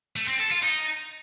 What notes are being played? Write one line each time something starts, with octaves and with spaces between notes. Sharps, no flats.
A3
C4
A4
F4
D#4